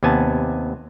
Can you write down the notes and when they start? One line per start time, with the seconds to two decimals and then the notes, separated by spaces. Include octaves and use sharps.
0.03 D#2 C3 B3 G#5 A5